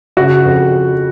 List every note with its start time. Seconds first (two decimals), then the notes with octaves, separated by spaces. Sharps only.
0.17 C#3 F#4
0.45 F2